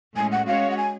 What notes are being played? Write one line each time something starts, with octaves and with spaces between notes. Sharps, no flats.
A2 G#3 C#4 G#5
F#5
G#3 C#4 F#4 C#5 F5
F#5
G#5